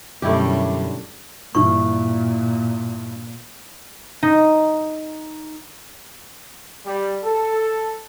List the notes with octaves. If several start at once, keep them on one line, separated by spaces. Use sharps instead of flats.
F#2 B2 D3 G3 A3 C#4 E4 G4
G2 A#2 E3 C#6
D#4
G3
A4